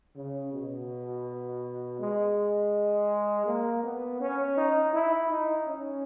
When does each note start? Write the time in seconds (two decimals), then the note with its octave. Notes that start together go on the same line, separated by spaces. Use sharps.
0.16 C#3
0.53 B2
2.00 G#3
3.46 A#3
3.83 B3
4.20 C#4
4.57 D#4
4.93 E4
5.30 D#4
5.67 C#4